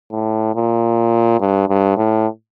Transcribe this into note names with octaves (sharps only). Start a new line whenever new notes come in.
A2
A#2
G2
G2
A2